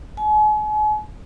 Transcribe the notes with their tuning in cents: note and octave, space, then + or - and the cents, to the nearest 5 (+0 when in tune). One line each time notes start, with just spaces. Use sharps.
G#5 +40